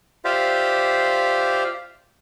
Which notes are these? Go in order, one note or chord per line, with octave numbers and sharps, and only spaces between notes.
F4 G4 C5 D5 E5 F5